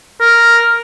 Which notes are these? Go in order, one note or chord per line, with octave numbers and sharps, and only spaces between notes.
A#4